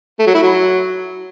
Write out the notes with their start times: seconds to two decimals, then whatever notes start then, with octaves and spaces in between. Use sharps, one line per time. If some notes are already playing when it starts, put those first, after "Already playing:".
0.19 A3
0.27 F#3
0.35 E4
0.42 F#3